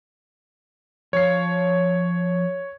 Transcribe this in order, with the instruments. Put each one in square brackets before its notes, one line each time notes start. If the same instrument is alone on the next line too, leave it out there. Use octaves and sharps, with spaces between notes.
[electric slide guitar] F3 C5 F5 [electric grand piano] C#5 C7